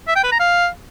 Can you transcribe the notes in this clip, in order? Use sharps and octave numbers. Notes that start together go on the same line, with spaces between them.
E5
G5
B4
A#5
F5